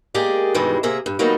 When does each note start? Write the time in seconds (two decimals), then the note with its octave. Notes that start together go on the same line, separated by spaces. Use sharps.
0.14 G#3 A#3 G4 G#4 D5
0.54 G2 B2 D#3 E3 G3 G#3
0.83 C3 A#3 G#4 E5 A#5
1.06 G2
1.19 D#3 F#3 G3 A#3 B3 D#4